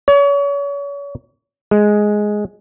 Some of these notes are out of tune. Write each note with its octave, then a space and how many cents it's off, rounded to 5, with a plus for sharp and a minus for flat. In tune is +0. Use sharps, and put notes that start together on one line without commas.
C#5 +35
G#3 +5